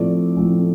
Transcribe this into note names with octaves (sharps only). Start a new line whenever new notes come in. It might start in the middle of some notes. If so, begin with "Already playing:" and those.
Already playing: A2 F3 A3 C4 D5
A2 F3 A3 C4